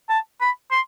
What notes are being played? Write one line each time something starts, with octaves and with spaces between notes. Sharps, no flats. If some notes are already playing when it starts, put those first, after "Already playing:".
A5
B5
C6